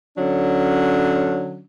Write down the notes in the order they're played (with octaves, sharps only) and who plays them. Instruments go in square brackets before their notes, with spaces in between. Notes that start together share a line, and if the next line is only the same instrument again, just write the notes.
[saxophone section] D3 F#3 C#4 D4